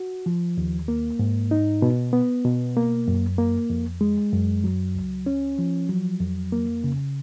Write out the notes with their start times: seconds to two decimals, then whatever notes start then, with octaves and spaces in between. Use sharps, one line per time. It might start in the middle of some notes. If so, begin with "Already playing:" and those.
Already playing: F#4
0.26 F3
0.57 D#2
0.88 A#3
1.19 G#2
1.51 D#4
1.82 B2
2.13 B3
2.45 B2
2.76 A#3
3.08 F#2
3.38 A#3
3.70 F2
4.01 G#3
4.32 F#2
4.64 F#3
4.95 C#2
5.26 C#4
5.59 F3
5.89 F#3
6.20 F2
6.52 A#3
6.84 C#3